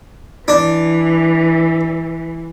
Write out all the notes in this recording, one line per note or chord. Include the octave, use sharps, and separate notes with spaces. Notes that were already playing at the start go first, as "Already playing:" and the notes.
E3 D4